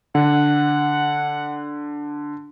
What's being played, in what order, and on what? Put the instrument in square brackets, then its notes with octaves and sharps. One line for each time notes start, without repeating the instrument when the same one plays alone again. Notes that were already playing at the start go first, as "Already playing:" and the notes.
[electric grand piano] D3 [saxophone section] F#5